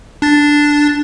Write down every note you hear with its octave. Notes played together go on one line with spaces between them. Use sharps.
D4 A6